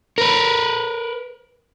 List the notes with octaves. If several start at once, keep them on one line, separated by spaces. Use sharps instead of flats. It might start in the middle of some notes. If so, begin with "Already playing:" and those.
A#4 B4